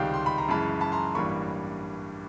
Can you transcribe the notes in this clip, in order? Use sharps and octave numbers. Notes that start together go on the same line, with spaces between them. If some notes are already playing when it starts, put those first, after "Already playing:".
Already playing: C#2 C3 D#3 G3 F5 G5
C6
B5
A#5
F#2 C#3 E3 G#3 A5 B5
A5 B5
A#5 C6
A1 G2 E3 G3 A#3 B5 C#6